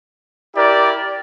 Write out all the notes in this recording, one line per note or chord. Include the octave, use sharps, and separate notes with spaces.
E4 G4 A#4 D5